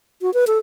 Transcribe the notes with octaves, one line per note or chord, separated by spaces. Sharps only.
F#4
B4
A4